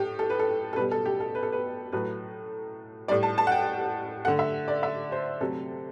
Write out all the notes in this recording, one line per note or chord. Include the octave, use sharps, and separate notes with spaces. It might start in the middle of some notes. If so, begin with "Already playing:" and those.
Already playing: A2 G4
A4
B4
A4
A4
B2 G3 B4
A4
G4
A4
B4
A4
B4
A2 F#3 A3 B4
A2 G3 D5
A5
A5
F#5
G5
D3 A3 F#5
E5
D5
E5
C5
C3 F#3 A3 A4